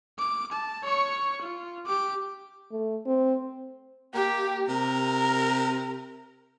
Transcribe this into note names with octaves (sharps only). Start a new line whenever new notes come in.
D6
A5
C#5 C#6
F4
G4 D6
A3
C4
A#3 G4
C3 A#4